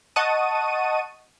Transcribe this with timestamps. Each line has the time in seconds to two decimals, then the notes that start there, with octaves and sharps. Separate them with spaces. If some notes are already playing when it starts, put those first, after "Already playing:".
0.16 D#5 F#5 A5 C#6 D#6 D#7